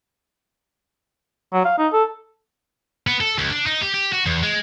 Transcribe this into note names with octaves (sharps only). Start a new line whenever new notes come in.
F#3
F5
D#4
A4
B3
A4
C#2
D4
D#4
G4
G4
F#4
E2
G#3